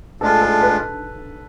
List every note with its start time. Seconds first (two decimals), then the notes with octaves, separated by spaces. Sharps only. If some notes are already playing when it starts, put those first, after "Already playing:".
0.21 A2 G#3 D4 F4 A4
0.41 A4
0.61 B4